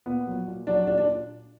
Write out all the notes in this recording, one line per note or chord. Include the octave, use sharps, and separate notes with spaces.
A#2 B3
F#3
A#2
F#3 D4
A#2 D4
D4